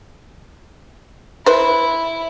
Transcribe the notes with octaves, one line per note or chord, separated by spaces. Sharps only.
E4 B4 C5